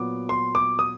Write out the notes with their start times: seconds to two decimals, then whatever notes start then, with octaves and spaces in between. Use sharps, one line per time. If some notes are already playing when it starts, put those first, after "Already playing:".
Already playing: A#2 F#3 B3 D6
0.29 C6
0.55 D6
0.79 D#6